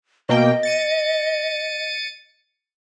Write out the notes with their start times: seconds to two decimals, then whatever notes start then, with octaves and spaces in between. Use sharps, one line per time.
0.29 B2 A#3 D#5 G5
0.63 A6 C#7 D#7